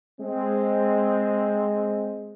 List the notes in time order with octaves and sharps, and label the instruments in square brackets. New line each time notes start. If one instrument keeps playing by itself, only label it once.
[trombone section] G#3 C4